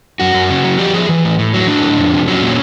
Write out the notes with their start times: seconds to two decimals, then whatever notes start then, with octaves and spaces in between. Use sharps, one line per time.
0.20 F#2 F#4
0.34 F#2
0.50 C#3
0.64 F#3
0.79 F3 G4
0.94 F3 G#4
1.09 E3
1.24 A2
1.39 A2
1.54 F#3
1.67 A2 D4
1.82 A2
1.98 F2
2.13 C3
2.28 F#3 C#4
2.41 A#2